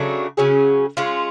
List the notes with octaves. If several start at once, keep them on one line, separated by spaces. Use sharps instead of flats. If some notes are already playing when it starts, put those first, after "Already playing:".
Already playing: C#3 F#3 A3 D4
C#3 F#3 C#4 G#4
G#3 C#4 F4